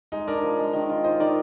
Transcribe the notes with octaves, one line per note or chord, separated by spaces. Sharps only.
G#3 D#4
D4 A#4 D5
F3
G#3
D#3
F4
F4 C5 D#5
D#3 A#4 D5